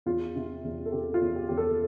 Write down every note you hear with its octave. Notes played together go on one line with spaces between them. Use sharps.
E2 F4
C3
E2
A4
C3 G4
F4
E2
G4
E2 G4
A4